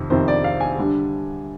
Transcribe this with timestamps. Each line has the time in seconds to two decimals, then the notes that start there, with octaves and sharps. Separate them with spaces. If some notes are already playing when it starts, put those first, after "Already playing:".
Already playing: F2 C3 D#3
0.10 F2 C3 D#3 C5
0.28 D5
0.44 F5
0.61 G#5
0.78 D3 G3 D4